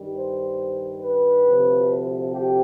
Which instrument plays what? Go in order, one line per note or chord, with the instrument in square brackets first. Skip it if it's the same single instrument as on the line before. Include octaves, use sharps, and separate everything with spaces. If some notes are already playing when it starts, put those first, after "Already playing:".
Already playing: [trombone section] G2 D#3 G3
C5
B4
D2 C3 F3
G4